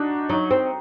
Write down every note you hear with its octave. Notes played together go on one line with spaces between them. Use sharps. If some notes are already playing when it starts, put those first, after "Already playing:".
Already playing: D4 D#4 F#4
F#3 D#4
C4